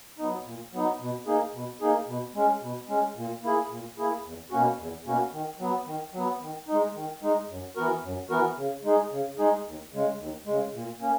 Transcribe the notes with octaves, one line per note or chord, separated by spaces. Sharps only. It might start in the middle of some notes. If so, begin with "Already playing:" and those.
F#3 B3 D#4
A#2
F#3 B3 D#4
B2
A#3 D#4 G#4
B2
A#3 D#4 G#4
B2
G#3 C#4
B2
G#3 C#4
A#2
A#3 E4 G#4
A#2
A#3 E4 G#4
E2
B2 A#3 C#4 F#4
E2
B2 A#3 C#4 F#4
D#3
F#3 B3
D#3
F#3 B3
D#3
D#4
G#3
D#3
G#3 D#4
F#2
E3 B3 F#4 A#4
F#2
E3 B3 F#4 A#4
C#3
G#3 D#4 G#4
C#3
G#3 D#4 G#4
D#2
C#3 G#3
D#2
C#3 G#3
A#2
A#3 C#4